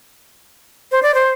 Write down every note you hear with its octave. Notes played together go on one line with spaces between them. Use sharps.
C5
D5
C5